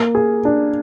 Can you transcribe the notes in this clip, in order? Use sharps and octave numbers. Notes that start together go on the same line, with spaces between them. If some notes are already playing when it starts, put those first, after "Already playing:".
Already playing: A#3
G#4
D4